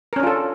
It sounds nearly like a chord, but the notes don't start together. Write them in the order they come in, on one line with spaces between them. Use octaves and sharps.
A#4 C#4 D4 F4 A4